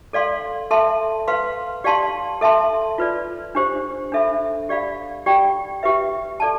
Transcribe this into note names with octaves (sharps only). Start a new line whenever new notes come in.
A4 D5 F5 C6
A4 E5 A5 C6
B4 F5 C6
G4 D5 F5 A5 C6
A4 E5 A5 C6
F4 B4 D5
D4 G4 C5
D4 A4 E5 B5
G4 D5 F5 B5
G4 D5 G5 B5
G4 B4 E5
A4 D5 A5